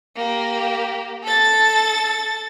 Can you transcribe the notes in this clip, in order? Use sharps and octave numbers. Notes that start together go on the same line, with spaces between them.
A#3 G4
A4 A6